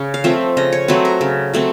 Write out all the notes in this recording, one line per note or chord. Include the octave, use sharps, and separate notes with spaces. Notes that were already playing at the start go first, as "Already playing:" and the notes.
Already playing: C#3 C#5
F5
F3 A3 C4 E5
C#3 D#5
C#5
F#3 A3 C4 B4
A#4
C#3
F#3 A3 C4